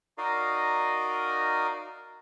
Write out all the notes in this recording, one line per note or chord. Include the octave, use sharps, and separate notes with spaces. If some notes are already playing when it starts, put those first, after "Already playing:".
D#4 F#4 A#4 D5 D#5 F5